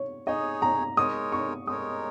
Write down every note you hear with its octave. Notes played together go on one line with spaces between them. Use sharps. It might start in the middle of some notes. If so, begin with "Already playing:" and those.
Already playing: C#5
D#4 G#4 C#5 D#5
A#5
G#3 D#4 A#4 C#5 D#6
C#6
G#3 D#4 A#4 C#5 D#6